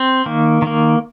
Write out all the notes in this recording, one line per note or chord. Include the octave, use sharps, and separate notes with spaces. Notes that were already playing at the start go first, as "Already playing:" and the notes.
Already playing: C4
D#3 A#3
D#3 A#3